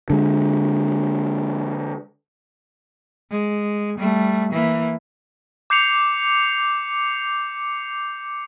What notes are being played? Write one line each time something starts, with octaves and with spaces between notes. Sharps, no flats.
D3 G#3
G#3
G3 A3
E3 A#3
D6 G6 C7 C#7 F7